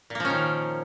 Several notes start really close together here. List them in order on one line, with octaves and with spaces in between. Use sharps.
A#2 A#3 F3 C#4 D#3